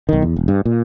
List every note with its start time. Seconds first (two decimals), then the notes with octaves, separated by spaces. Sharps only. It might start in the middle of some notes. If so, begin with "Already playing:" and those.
0.09 B1 D#3
0.22 E2
0.36 E1
0.48 G2
0.65 A#2